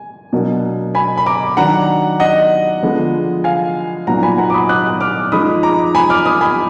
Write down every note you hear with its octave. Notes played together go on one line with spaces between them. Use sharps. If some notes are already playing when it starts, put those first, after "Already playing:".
Already playing: G#5
B2 F#3 A#3 D4
G#5 B5
B5
A#5 D6
D#3 F#3 D4 F#5 A#5
D#5 F#5
D3 F3 G#3 B3
F5 G#5
A#2 F#3 B3 D#4 F#5 A#5
G#5 B5
F#5 A#5
D6
B5 D#6
D#6 F#6
D6 F6
F3 G#3 D#4 B5 D#6
A#5 D6
G#5 B5
D6 F6
B5 D#6
G#5 B5